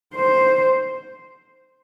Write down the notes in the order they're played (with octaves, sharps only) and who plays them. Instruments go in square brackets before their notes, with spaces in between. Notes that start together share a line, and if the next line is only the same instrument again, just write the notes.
[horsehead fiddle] C5